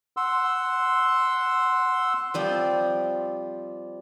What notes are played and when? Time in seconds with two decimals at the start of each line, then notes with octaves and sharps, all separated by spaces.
0.17 F#5 C6 E6
2.34 F3 G3 C4